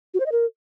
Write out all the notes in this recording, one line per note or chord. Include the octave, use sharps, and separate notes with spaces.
F#4
C5
D#5
A#4